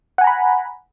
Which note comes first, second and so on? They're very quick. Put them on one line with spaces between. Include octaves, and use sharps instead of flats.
F#5 G#5 A#5 B5